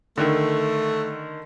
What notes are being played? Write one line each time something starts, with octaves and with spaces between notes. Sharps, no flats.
D3 D#3 A3